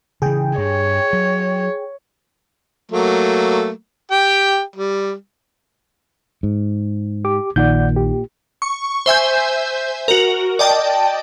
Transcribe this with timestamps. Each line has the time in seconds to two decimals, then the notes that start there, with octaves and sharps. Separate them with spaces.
0.22 C#3 E3 G#4 G5
0.58 G2 C#5
1.13 F#3
2.92 F#3 A3 A#3
4.11 G4 G5
4.76 G3
6.43 G#2
7.25 G4 D6
7.56 A#1 A#2 D#3 D5 F#5 G6
7.96 G4
8.62 C#6
9.06 C5 E5 G#5 G6
10.08 F#4 A#4
10.59 D5 D#5 G5 A5